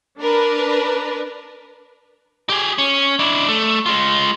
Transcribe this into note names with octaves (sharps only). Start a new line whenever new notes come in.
D4 A#4 B4
G4 G#4
C#4
D4 E4
A3
G#3 F4